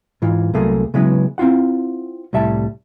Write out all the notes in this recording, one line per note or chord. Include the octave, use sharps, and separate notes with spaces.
G#2 E3 F4
C2 F#3 A3 A#3 G#4
C#3 F#3 G#3 B3 E4 B4
C4 E4 F4 F#5
C2 A2 G3 E5 A5